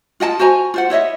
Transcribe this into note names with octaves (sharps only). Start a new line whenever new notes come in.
F4 D#5 F#5 A5
F#4 C5 G#5 A#5
F4 C5 F#5
E4 C#5 D#5 E5